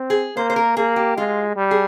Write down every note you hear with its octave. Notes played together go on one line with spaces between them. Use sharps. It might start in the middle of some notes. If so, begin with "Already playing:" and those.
Already playing: C4
G#4
A#3 C5
C5
A#4
A#3 G#4
G4
G#3 F4
G3
G#4